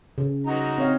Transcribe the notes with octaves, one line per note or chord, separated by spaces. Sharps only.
C#3
D#4 F#4 A#5
C4 C#5 F5